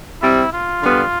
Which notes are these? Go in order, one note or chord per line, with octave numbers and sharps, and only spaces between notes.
C3 G3 C4 E4
F4
D3 G3 B3